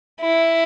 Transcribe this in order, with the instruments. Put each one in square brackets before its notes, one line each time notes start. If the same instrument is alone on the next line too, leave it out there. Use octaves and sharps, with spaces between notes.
[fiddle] E4